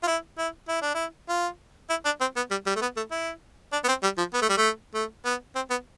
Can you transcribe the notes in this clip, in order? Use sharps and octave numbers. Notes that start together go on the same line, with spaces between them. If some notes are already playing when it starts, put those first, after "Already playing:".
F4
E4
E4
E4
D4
E4
F4
E4
D4
C4
B3
G3
G3
A3
B3
A3
E4
D4
B3
C4
G3
F3
B3
A3
G3
A3
A3
B3
C4
B3